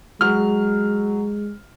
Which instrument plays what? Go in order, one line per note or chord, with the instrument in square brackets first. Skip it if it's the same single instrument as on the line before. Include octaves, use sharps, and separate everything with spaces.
[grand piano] F#3 F6 [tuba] G#3